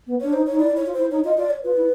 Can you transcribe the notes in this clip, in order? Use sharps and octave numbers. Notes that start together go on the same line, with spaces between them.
B3
D4 C#5
D#4 C5
C#5
D#4
E4 D5
E4
C#5
F4
E4 C5
D#4 C#5
F4 D#5
F4 D5
C#5
F4 B4
E4